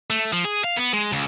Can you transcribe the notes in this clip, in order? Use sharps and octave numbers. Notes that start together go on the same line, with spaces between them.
A3
F3
G#4
F5
B3
G#3
C#2